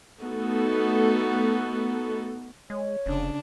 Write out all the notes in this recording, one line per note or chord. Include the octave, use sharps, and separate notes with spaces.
A3 B3 D#4 F#4 A4
G#3 C#5
F1 C#3 D4